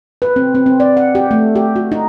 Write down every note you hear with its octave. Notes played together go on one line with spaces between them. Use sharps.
B4
C4
C4
C4
D5
F#5
G4
A3
G4
F#4
D#4